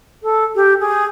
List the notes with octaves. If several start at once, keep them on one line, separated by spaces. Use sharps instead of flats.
A4
G4
G#4